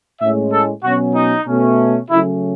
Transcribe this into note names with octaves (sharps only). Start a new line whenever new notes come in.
A2 G#3 C#4 E5
A4
B2 F#3 C#4 F#4
D#4
B2 A3 C#4
C#3 F#3 A3 C#4 E4